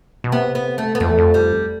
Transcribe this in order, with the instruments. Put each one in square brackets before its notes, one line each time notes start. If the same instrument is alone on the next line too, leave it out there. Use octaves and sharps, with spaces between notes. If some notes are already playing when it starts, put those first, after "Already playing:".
[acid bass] B2
[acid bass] C3 [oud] B3
[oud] B3
A3
B3
[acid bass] F2 [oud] A3
[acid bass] E2
F2
[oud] G3